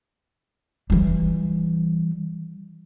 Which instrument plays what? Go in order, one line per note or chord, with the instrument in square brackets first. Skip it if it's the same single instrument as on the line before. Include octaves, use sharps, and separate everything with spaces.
[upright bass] E3 G3